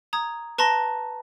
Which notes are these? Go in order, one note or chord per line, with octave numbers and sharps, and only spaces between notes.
A#5 D#6 G#6
B4 A5 A#5 C6 A#6